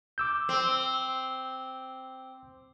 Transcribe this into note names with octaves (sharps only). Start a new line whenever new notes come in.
D6 E6 G6
C4